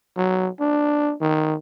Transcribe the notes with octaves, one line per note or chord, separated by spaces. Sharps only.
F#3
D4
D#3